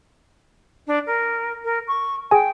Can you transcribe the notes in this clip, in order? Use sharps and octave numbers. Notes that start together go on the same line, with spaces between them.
D4
A#4
A#4
C#6
G#4 G5 G#5